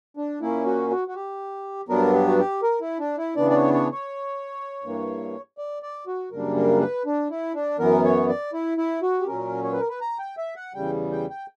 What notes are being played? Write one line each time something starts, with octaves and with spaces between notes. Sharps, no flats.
D4
A#2 A#3 C#4 E4
F#4
F#4
F#4
G4
G2 F#3 B3 D4 A#4
G4
F#4
G4
A#4
E4
D4
E4
C#3 E3 B3 D4 D5
D5
C#5
C#5
C#5
G2 E3 A#3
D5
D5
F#4
F#2 C#3 G3 A#3 D4 A#4
A#4
B4
D4
E4
D4
F#2 E3 B3 A#4
C#5
D5
E4
E4
F#4
G4
A#2 F#3 C#4 A#4
C#5
B4
A#4
B4
A#5
G5
E5
F#5
E2 C#3 G3 G5
G5
G5